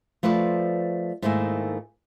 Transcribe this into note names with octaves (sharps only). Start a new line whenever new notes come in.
F3 A3 B4 C5 D5
G#2 D#3 A3 A#3 E4 G#5